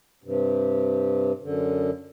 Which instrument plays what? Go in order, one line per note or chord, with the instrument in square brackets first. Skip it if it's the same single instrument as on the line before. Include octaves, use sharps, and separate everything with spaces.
[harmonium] G2 C3
F#2 D3